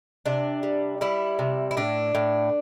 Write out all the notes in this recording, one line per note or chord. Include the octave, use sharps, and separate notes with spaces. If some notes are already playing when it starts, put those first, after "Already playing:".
C3 D4
G3
G3 E4
C3
E4
A2 D4
A2